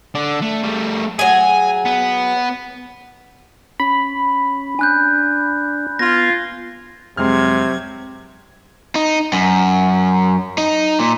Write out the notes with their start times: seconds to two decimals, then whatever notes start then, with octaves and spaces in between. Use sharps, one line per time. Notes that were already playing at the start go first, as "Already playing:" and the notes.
0.15 D3 D5
0.42 A3
0.63 G3 A3
1.19 F#3 G#4 G#5
1.85 B3
3.80 C#4 B5
4.79 D4 G#5 F#6 G6
5.99 B3 F4 G#6 A#6
7.17 F2 C3 F#3 G#3 C4 C6 F6 G#6
8.95 D#4
9.33 F#2
10.58 D#4
11.00 A#2